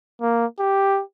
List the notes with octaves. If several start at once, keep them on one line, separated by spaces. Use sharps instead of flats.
A#3
G4